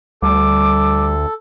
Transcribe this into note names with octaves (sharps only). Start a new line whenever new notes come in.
D2 G3 A4 D6